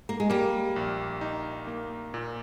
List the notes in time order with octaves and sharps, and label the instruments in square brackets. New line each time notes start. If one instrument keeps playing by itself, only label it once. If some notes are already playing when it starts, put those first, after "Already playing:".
[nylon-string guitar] A#3
G#3
[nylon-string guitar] G3 [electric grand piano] A#3
[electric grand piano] A#1
D#4
A#3
A#2